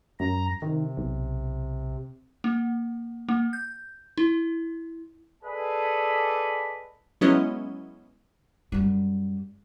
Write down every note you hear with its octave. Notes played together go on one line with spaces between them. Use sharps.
F#2 A#5
C3 D#3
B1
A#3
A#3
G6
E4
G#4 A4 B4 D5 D#5 G#5
F#3 G#3 B3 C#4 E4 D#5
F#2 G3